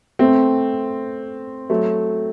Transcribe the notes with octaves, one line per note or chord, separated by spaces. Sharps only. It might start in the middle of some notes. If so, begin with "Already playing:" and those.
A3 C4
F#3 A3